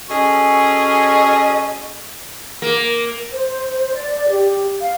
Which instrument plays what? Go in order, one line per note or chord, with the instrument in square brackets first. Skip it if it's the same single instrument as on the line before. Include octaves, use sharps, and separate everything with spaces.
[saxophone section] C#4 F#4 G#4 A4 D#5
[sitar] A#3
[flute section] C5
D5
G4
F5